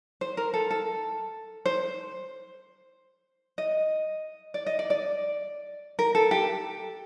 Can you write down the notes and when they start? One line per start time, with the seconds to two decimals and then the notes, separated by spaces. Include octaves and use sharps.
0.21 C5
0.37 A#4
0.54 A4
0.71 A4
1.66 C5
3.58 D#5
4.54 D5
4.66 D#5
4.79 D5
4.90 D5
5.99 A#4
6.15 A4
6.31 G4